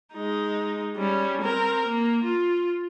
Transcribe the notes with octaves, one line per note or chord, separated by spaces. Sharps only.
G#3 D#4
G3 C#4
C4 A#4
A#3
F4